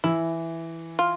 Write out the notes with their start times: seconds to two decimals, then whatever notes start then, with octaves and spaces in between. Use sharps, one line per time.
0.04 E3 E4
0.99 F4